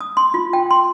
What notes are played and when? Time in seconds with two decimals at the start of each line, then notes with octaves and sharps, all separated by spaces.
0.01 D#6
0.17 C6
0.34 F4
0.53 G5
0.71 C6